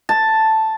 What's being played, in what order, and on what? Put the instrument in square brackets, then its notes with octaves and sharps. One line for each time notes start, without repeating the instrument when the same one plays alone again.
[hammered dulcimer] A5